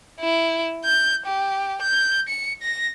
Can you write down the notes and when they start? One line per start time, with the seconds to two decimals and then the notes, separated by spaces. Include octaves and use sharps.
0.20 E4
0.84 G6
1.27 G4
1.82 G6
2.29 C#7
2.62 A#6